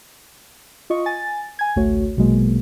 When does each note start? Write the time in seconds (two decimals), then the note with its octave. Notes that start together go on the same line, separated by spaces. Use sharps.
0.90 F4 D#5 C#6
1.06 G#5 A6
1.59 G#5 G#6
1.76 A1 D2 A3 F#4 C#5
2.17 A#1 B2 F#3 G#3 A#3